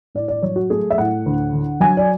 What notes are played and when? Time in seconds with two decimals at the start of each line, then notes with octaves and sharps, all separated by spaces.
0.15 A2 D5
0.28 D5
0.42 F#3 C#5
0.56 F#4
0.70 A3 G#4
0.90 E5
0.98 A2 F#5
1.26 D2
1.53 D3
1.80 F#3 G#5
1.97 D5